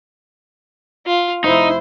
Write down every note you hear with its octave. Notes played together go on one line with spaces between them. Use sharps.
F4
F1 D#4 E4 C5